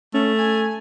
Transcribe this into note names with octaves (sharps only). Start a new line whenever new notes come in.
A3 C#4
G#5